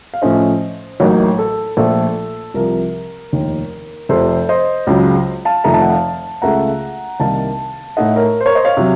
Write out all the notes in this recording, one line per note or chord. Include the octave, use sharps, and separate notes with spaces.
F5
A2 F3 A3 C#4 C5 D#5
A1 A2 F#3 A#3 D#4
A4
A#1 A#2 F3 A3 A4
C2 C3 F3 A#4
F1 D#2 D#3
F1 F2 C3 A4 C5
C5 D#5
C#2 C#3 F#3
F5 A5
F1 F2 D#3 A3 A#5
A5
F#5
F5 A5
C#2 C#3 A3 F#5 A#5
C2 C3 D#3 A#3 D#4 F5 A5
A2 A3 D#4 D#5 F#5
A#4 C#5
C5
A#4 C#5
C5 D#5
C#5 F5
C3 F#3